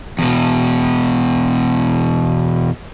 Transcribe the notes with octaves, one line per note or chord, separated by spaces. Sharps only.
E2 B2